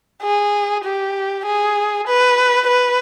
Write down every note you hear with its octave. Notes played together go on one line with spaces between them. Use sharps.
G#4
G4
G#4
B4
B4